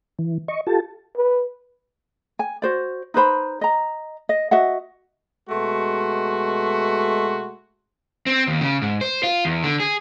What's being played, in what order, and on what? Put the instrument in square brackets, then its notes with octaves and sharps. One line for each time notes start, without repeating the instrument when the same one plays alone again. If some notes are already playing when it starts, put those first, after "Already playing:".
[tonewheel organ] E3
D#5 C#6
F4 G4 A4 A5
[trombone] B4
[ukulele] G#5
F#4 C5 D5
D#4 B4 C5 B5
D#5 A#5
D#5
F#4 D#5 E5 F#5
[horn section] B2 G#3 A3 F#4 C6
[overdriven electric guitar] C4
D#2
C#3
G#2
C5
F4
E2
D3
G#4